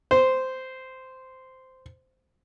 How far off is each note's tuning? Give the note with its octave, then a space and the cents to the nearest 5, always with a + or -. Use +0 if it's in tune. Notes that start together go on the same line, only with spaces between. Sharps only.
C5 -10